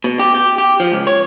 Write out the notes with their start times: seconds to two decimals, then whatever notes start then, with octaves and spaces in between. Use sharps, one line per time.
0.04 B2
0.19 G4
0.35 G4
0.58 G4
0.80 F3
0.92 C#2
1.07 C#5